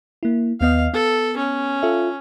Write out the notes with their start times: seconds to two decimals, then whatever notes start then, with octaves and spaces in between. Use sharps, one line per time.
0.23 A#3 E4
0.61 D#2 B3 D#5 F5
0.93 B3 A4
1.37 C#4
1.82 F4 A4 E5